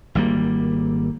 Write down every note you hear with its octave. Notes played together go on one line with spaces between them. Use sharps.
G#1 G3 A#3